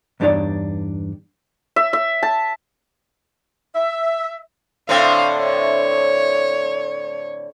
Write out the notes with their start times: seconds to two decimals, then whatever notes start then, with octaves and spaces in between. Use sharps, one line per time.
0.20 E2 G2 D4 D#4 C#5 D5
1.76 E5
1.93 E5
2.23 A5
3.73 E5
4.89 A2 D3 C4 F5
5.38 C#5